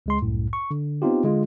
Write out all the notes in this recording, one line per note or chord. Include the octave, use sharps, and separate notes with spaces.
C#2 G#3 C6
C2 F#2 A2
C#6
D3
B3 C4 D#4 F4 G4
D3 G#3 F4